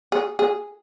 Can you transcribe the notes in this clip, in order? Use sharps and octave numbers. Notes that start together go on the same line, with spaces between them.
G#4
G#4